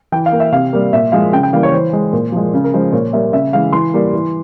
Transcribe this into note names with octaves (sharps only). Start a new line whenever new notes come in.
E3 G5
F5
A#3
E5
C3 F5
G3 A#3
A#2 E5
F3 G#3 F5
C#3 G5
G5
E3 G3 A#3 F5
C#5
E3 C5
G#3
A#2
F3 G#3
C#3
A#4
F3 G#3 C5
A#2 C#5
G3 A#3 E5
C#3 E5
E3 G#3 F5
E3 C6
G3 A#3
E3